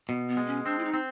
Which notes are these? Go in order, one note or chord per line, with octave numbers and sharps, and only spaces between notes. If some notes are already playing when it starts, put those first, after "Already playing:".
B2 B3
B3
G#3
C#4
C4 D4
E4
D#4
C4